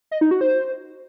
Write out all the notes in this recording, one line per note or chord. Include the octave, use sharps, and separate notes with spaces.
D#5
D#4
F#4
C5